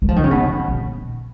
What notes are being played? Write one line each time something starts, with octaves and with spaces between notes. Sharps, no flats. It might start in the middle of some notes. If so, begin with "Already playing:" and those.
F#3
F3
D#3
C#3
B2
A#2